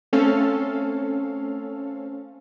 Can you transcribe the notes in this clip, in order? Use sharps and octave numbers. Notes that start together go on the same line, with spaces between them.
A3 C4 C#4 A4 F5